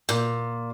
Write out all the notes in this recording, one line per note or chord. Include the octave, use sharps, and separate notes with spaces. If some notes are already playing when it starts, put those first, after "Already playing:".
A#2